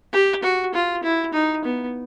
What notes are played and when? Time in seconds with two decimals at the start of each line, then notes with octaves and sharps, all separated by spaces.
0.13 G4
0.43 F#4
0.74 F4
1.03 E4
1.33 D#4
1.65 B3